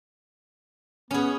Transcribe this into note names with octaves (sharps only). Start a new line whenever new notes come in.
B3 C#4 G#4